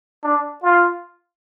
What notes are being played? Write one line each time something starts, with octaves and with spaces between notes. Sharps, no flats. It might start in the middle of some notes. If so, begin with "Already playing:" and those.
D4
F4